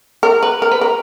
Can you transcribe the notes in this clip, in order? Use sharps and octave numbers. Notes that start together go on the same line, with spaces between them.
A#4
B4
A#4
B4
A#4